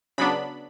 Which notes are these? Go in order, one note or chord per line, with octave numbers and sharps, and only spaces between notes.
C#3 F#3 B3 D4 B5